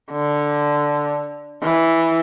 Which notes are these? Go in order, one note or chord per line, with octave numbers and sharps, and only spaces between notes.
D3
E3